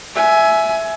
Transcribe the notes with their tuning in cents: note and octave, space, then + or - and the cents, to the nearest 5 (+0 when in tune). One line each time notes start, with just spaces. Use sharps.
E5 +0 G#5 +20